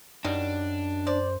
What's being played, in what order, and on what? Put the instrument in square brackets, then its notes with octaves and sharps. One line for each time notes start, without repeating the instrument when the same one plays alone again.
[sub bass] F#2 [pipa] D#3 F#3 G3 [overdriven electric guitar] D4
[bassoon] C5 [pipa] D5